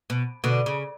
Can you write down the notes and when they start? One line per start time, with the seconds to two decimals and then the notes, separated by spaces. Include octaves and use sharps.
0.10 B2
0.44 B2 D3
0.66 C#3